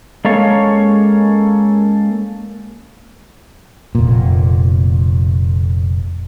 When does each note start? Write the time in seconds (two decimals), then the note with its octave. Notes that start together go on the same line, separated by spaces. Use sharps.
0.25 G#3 A#3 C#4 A4 C#5 F5
3.95 F1 A#2